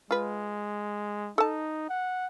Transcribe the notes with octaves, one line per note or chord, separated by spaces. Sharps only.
G#3 F4 B4
D#4 A4 A5
F#5